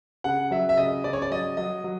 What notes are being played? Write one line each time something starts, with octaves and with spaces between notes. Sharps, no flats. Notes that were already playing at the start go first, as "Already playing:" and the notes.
C#3 F#5
F#3 E5
E5
C#3 D#5
C#3 D5
C#5
D5
F#3 D#5
F#3 D#5
F#3